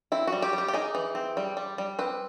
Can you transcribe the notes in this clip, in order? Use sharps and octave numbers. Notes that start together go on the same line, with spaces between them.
C4 E4
G3 F#4
G4
G3
G4
G4
D#4 G#4
E3
C4
G3
G3
G3
C4 B4